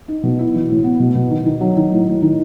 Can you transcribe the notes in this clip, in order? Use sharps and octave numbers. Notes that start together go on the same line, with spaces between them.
D#4
B2
E4
E3
A2
B3
B2
B2
D#3
D#3
F#3
D#3
A2
A2
D#3